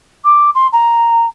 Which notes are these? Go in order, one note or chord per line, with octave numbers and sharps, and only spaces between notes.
D6
C6
A#5